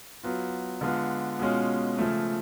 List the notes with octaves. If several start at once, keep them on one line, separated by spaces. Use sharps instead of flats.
F#3 B3 F4
D3 G#3 B3 F4
B2 G#3 C#4 F4
C#3 F3 A3